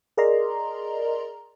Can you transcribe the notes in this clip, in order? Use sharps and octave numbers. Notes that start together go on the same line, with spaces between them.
G#4 A#4 D5 D#5 A#5 C6